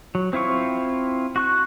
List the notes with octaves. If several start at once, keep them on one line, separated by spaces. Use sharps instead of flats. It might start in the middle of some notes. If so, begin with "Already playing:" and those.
F#3
C4 E4 F4 C#6
F#4 C#6 F#6